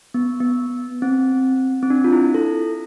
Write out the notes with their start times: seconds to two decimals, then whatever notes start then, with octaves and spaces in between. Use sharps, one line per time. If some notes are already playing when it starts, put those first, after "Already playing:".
0.14 B3
0.40 B3
1.02 C4
1.83 C4
1.90 D4
2.04 F4
2.12 E4
2.34 A4